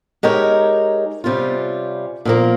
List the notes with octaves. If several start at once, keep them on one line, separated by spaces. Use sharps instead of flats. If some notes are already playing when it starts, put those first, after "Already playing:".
G#3 D#4 G4 A#4 C#5
C3 G3 C#4 F4
A#2 F3 A#3